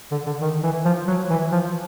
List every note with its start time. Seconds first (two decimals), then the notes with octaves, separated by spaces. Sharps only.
0.11 D3
0.26 D3
0.41 D#3
0.63 E3
0.85 F3
1.08 F#3
1.30 E3
1.52 F3